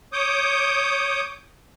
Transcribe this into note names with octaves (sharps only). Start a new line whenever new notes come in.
C#5 D6 D#6 G6